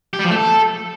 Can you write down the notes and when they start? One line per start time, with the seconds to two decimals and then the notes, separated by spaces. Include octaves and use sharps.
0.13 G4
0.19 G3
0.25 F3
0.30 A3
0.36 A4